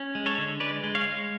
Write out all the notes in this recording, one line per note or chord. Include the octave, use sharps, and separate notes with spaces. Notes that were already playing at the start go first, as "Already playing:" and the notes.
Already playing: C#4
G#3
A4 C#5
D3
G#3 B4 D5
G#3
C#5 F5
G#3